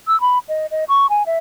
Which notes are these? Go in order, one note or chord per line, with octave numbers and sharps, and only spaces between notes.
E6
B5
D#5
D#5
C#6
G#5
E5